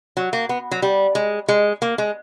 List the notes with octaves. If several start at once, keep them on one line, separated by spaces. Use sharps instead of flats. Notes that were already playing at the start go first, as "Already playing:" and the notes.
F#3
A#3
B3
F#3
G3
G#3
G#3
A#3
G#3